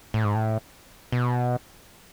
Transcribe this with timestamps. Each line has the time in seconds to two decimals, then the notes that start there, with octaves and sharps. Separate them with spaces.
0.14 A2
0.24 G#2
0.35 A2
1.12 B2